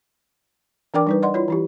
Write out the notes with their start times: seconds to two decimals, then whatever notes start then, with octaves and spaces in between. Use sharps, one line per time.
0.94 E3 D4 A#4 D5 G5 D6
1.07 G3 D#4 B4
1.22 D5 D#5 F#5 C6
1.34 E4 F4 C#5
1.48 E3 E4 G4